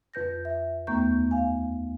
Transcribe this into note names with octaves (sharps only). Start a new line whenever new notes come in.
F2 B4 G6 A#6
E5
D#2 A3 B3 A#5 C#6 G6
F5 G#5